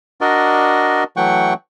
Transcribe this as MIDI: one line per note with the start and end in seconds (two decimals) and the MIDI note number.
0.21 1.04 62
0.21 1.04 66
0.21 1.04 70
0.21 1.04 74
0.21 1.04 75
1.17 1.54 52
1.17 1.54 54
1.17 1.54 57
1.17 1.54 78
1.17 1.54 79
1.17 1.54 85